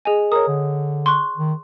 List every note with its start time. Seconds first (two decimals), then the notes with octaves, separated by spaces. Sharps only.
0.05 G#4 D#5 G#5
0.32 A#4 C#5 D#6
0.48 D3
1.06 C6 C#6 F#6
1.37 D#3